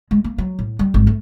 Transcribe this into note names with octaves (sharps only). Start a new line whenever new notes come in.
G#3
A#3
F#3
A2
G3
G#1
A3